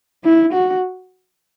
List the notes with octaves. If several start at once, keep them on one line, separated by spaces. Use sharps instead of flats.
E4
F#4